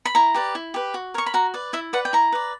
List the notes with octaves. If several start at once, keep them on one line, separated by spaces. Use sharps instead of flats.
B5
E4 A#5
G4 B4 D5
E4
G4 B4
F#4
A#4 C#5 C#6
B5
F#4 A#5
B4 D5
E4 E5
B4 D5 F#5
G5
E4 A#5
B4 D5